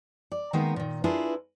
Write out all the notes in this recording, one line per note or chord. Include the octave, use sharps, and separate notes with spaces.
D5
D#3 G#3 A#3 B3 D#4 A#4
A#2 D#3
D4 E4 F4 G#4 A#4 B4